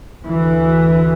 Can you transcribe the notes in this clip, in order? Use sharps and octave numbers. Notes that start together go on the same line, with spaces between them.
D2 E3